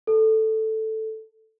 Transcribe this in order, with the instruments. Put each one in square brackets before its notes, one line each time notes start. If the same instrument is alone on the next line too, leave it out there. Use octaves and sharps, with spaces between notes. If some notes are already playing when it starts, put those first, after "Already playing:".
[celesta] A4